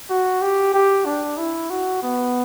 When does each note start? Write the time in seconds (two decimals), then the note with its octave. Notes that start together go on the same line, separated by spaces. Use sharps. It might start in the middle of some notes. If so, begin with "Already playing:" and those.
0.10 F#4
0.42 G4
0.74 G4
1.06 D4
1.38 E4
1.70 F#4
2.03 B3